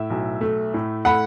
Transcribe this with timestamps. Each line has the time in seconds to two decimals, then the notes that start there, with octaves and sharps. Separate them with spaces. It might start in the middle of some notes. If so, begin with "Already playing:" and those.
Already playing: A2 E5
0.10 B1
0.41 A3
0.74 A2
1.05 A3 F#5 B5